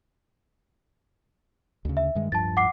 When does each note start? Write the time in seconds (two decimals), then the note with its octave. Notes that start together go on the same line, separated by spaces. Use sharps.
1.85 D2 C#3
1.97 E5
2.15 G2 D#3 G#3
2.32 D1 G2 F3 A5 A6
2.57 F#5 D6 C7